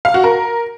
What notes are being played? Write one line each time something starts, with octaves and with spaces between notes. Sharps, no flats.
F5
F#4
A#4